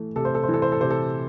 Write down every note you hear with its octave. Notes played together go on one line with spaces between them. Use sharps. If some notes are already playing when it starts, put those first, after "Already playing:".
Already playing: E3 A3
C3 A4
C5
A4
C5
E3 A4
C5
A4
C3 C5
A4